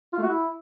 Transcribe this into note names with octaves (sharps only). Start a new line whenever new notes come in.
F4
A3
F#4
E4